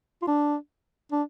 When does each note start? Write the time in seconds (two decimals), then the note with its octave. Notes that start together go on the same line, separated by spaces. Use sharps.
0.22 F4
0.27 D4
1.12 D4